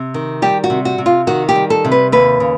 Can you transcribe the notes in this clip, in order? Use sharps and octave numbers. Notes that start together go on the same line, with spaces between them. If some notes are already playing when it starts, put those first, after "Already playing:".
Already playing: C3
D#3
G3 G4
F#4
C3
F#4
C3
F4
D#3 F#4
G4
G3
A4
C3
B4
D#2 B4
C#3